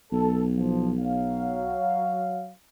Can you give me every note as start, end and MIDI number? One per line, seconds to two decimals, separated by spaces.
0.12 1.78 35
0.12 0.42 69
0.57 0.92 53
1.00 2.52 54
1.00 2.52 77